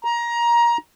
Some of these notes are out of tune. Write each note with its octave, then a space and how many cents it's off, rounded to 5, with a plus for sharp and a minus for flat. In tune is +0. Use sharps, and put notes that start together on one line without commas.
A#5 +20